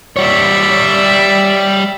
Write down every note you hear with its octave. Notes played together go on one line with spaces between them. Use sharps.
G3 C#5 D5 E5